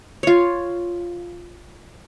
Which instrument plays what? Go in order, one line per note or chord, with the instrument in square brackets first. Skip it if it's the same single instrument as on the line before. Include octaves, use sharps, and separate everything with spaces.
[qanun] F4 C#5